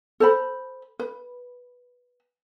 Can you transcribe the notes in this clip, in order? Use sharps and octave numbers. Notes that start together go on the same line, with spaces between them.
A4 C5 B5
B4